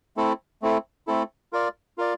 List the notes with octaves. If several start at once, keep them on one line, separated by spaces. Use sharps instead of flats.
A3 C4 E4 A4
A3 C4 E4 A4
A3 C4 E4 A4
F4 A#4 D5
F4 A#4 D5